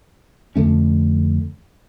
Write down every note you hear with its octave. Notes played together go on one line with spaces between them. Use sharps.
F2 D3 A3 C#4